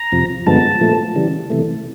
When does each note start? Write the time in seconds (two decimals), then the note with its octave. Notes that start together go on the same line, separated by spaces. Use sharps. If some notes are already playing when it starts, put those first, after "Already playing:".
Already playing: A#5
0.12 F2 C3 F3
0.46 G2 D3 F3 G#3 B3 A5
0.81 A#2 F3 A3
1.16 C#3 E3 G3
1.50 C3 E3 A3